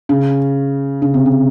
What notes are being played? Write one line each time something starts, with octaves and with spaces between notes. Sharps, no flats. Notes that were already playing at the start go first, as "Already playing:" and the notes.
C#3
C#3
C3
C#3